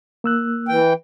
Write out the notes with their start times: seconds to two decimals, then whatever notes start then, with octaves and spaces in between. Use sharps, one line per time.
0.24 A#3 E6 F#6
0.69 E3 G5